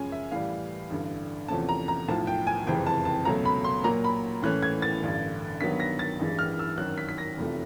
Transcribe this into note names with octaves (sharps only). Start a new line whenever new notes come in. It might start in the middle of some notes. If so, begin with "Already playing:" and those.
Already playing: F#2 C#3 F3 G#3 C#4 G#5
E5
A2 E3 G3 F5
A1 G2 D3
E2 C3 F3 A3 C#4 A5
A#5
A#5
B1 A2 F3 A5
G5
G#5
F#1 F2 C3 E3 G#3 G5
A5
A5
C#2 B2 F#3 A3 A#5
B5
C6
A#2 F#3 A#3 A#5
B5
A2 E3 A3 C#4 F#6
G#6
A6
A1 G2 D3
G2 D#3 F#3 B3 B6
A#6
A6
A1 G2 E3 G#3
F6
E6
G#1 F#2 D#3 F#3 F#6
B6
B6
A#6
F1 E2 C3 F3 A3